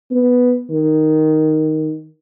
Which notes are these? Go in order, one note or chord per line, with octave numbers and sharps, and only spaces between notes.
B3
D#3